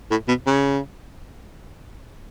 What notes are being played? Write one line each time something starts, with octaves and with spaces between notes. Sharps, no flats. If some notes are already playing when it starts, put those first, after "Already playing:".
A2
B2
C#3